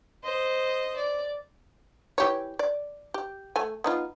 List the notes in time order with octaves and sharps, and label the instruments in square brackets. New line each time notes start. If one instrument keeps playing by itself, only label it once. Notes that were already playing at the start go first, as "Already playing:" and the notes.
[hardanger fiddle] C5 D#5
D5
[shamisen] E3 G4 C#5
D5
G4
A3 G#5
B3 D#4 F4